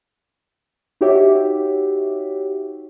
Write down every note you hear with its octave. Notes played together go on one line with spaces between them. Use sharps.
D#4 F#4 G4 C#5 E5